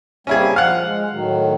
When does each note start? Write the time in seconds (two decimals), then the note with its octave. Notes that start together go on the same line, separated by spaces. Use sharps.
0.27 G3 A#3 C4 C#4 E4 G#4
0.56 F3 F5 F#5
0.84 G#3
1.10 A2 D#3 F#3